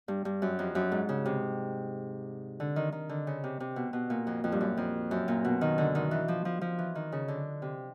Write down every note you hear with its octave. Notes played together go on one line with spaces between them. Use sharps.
G2
G2
F#2
F2
F#2
G#2
C#3
C3
D3
D#3
D#3
D3
C#3
C3
C3
B2
B2
A#2
F2
F2
G2
F#2
F2
F#2
A#2
B2
D#3
D3
D#3
E3
F3
F3
F3
E3
D#3
C#3
D3
C3